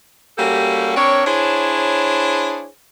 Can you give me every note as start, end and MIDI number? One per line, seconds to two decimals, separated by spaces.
0.37 0.93 55
0.37 0.93 58
0.37 0.93 61
0.37 0.93 66
0.37 0.93 67
0.37 0.93 69
0.97 1.24 60
0.97 1.24 62
0.97 1.24 70
0.97 1.24 73
1.26 2.66 62
1.26 2.66 64
1.26 2.66 68
1.26 2.66 72
1.26 2.66 73